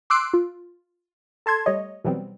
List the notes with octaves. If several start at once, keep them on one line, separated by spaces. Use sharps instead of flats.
C6 D6 E6 F#6 C7 D7
F4
A4 A5 C6 G#6
G3 A3 C#5 D#5
B2 E3 F#3 G3 B3 C4